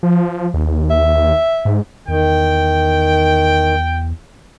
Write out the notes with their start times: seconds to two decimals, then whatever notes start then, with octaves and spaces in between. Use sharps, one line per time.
0.03 F3
0.54 D#2
0.90 E5
1.65 G#2
2.08 E2 D#3 G5